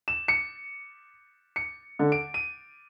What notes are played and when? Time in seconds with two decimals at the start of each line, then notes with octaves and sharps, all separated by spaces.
0.08 E7
0.28 C#7
1.56 C#7
1.99 D3
2.12 D7
2.34 D#7